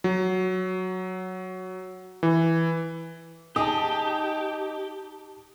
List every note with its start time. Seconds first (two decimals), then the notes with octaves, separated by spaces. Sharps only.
0.04 F#3
2.23 E3
3.56 D#4 G4 G#4 A5 D#6